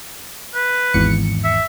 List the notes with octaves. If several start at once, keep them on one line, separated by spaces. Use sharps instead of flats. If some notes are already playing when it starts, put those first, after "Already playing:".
B4
G#1 E2 C#7
E5